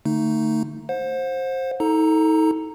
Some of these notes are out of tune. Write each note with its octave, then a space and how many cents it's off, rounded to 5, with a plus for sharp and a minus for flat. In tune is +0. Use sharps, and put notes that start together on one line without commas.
D3 +35 A3 +30 D#4 +0
C5 +15 F#5 -40
D#4 +40 A4 +0 A#5 +0